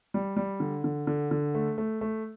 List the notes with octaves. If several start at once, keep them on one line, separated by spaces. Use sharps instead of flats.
G3
G3
D3
D3
D3
D3
A3
A3
A3